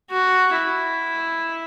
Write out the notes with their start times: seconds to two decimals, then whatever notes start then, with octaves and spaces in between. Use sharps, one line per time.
0.10 F#4
0.55 E4